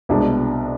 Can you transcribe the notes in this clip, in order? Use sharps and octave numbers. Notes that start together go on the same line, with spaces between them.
C2 B2 G#3 D4